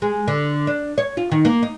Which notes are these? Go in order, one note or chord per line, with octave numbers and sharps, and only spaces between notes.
G#3
D3
D4
C#5
F4
D#3
A#3
D#4